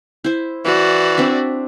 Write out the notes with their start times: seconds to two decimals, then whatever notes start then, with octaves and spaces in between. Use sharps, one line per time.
0.24 E4 C5
0.65 E3 F#4 D5
1.18 C4 D4 E5